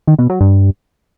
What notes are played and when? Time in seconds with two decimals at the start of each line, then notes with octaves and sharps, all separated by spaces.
0.07 D#3
0.19 B2
0.30 F#3
0.41 G2